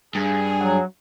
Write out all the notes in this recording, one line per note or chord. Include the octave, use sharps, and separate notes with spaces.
G2 G#4
F#3